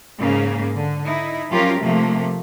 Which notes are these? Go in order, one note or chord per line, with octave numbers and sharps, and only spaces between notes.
G#2 C#3 A#3 C#4
D3
D#4 E4
F3 F#3 C#4 F4 G4 A#4
C3 F3 A3 A#3